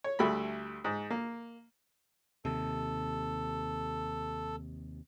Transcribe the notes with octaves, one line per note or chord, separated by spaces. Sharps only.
C#5
D2 G3 A3 B5
G#2
A#3
D#2 C3 A4